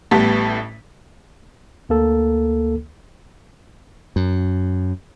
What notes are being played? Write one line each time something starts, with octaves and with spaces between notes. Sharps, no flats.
A1 A2 G3 B3 A5 B6
D2 A#3 A4
F#2